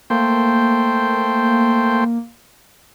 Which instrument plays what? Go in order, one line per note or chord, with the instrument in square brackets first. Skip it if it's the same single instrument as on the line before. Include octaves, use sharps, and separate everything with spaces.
[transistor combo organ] A3 C5 G5 [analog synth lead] A#3